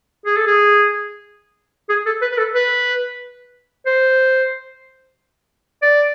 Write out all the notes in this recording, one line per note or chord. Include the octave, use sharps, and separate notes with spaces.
G#4
A4
G#4
G#4
A4
B4
B4
A4
B4
C5
D5